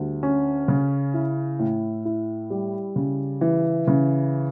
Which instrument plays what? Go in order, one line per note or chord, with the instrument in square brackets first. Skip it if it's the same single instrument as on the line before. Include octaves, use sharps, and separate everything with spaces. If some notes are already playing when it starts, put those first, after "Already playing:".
Already playing: [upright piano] D2 G3
C#4
C#3
E4
A2
E4
G3
C#3
E3
C#3